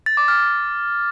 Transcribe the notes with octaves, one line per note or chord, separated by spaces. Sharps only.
A6
D6
F6